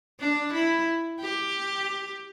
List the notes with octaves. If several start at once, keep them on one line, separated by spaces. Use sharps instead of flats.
D4
E4
G4